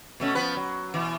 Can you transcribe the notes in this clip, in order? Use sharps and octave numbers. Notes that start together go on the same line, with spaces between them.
B2 A3 C#4
F3 B3 B4
F#3
B2 E3